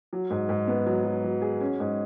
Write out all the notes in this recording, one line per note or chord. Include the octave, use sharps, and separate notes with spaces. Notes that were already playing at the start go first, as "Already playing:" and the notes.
F#3
G#2
G#2
B3
F#3
F#3
F#3
G#4
C#4
G#2